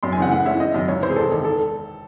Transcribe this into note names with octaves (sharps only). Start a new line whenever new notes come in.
F#2 C6
G#5
C#3 E3 C4 F#5
A2 F#5
G#3 C#4 E4 E5
G#1 D#5
F#2 D#3
C#2 C#5
C3 E3 C5
G#4
E1 A4
E2 D#3
A4